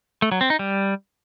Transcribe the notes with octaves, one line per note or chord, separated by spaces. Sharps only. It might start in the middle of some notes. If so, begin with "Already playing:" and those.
A3
F#3
C4
D#4
G3